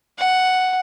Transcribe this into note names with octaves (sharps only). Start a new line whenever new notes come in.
F#5